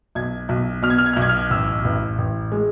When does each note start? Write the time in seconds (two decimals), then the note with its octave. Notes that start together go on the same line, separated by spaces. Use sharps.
0.15 B1 G#6
0.49 B1
0.82 B2 F6
0.90 G#6
0.98 F6
1.06 G#6
1.13 F6
1.16 B1
1.22 G#6
1.29 F6
1.50 A1 E6
1.85 A1
2.18 A1
2.52 G#3